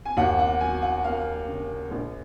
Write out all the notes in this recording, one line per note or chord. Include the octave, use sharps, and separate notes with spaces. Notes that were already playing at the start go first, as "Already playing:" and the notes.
G#5
D#2 F#5
F#5
F#3 G#5
F#5
A#3 F5
C#3
A#1